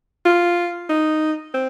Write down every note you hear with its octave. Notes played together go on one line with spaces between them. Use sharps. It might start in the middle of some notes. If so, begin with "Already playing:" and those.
F4
D#4
C4